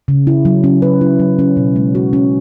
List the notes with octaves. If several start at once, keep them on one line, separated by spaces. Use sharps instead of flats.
C#3
E4
F#3
C#4
B4
E4
F#3
C#4
B2
G#3
F#4
C#4